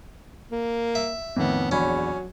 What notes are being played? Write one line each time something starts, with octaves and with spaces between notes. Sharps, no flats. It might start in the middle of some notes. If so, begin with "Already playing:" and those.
A#3
E5
F2 A2 D#3 B3
A#1 E2 F#3 C#4 B5